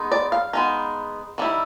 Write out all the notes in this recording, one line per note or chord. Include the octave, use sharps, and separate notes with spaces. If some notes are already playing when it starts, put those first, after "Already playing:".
Already playing: G#3 B3 D#4
D5
F5
G#3 B3 D#4
D#3 G3 B3 E4